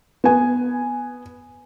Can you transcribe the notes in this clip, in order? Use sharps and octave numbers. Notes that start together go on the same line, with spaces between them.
B3 G#5